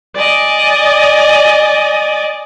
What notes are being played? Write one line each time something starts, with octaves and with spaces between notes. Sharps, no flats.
D5 D#5 G#5